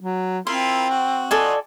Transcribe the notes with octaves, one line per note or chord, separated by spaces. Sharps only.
F#3
C4 E4 F4 A#4 C6
F#4
F4 F#4 A4 D5 D#5 G#5